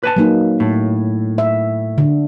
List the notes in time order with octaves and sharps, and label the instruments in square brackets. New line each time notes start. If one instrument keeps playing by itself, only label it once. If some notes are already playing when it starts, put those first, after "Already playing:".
[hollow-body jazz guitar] B4 G#5 A5
[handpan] F#3 A#3 D#4
[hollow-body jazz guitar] A2
[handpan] E5
D3